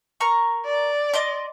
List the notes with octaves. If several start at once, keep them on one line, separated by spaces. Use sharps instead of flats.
A#4 A#5 C#6
D5
D#5 C6 D6